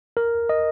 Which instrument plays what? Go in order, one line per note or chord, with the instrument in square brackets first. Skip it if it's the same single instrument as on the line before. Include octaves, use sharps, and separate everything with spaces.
[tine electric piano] A#4
D#5